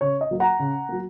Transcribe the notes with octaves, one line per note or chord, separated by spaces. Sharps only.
C#3 C#5
D#5
F#3 A#3
F#5 A#5
C#3
F#3 A#3